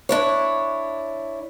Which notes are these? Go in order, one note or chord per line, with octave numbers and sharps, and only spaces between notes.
D4 E4 C#5